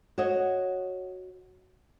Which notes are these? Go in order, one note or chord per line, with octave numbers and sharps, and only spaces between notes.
F#4 C#5 D#5